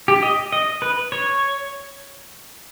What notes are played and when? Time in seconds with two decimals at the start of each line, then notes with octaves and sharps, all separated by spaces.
0.08 G4
0.23 D#5
0.52 D#5
0.82 B4
1.12 C#5